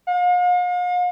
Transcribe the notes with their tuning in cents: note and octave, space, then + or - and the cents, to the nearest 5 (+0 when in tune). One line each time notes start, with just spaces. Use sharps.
F5 +45